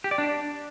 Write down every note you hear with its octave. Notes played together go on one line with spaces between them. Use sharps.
G4
D5
D4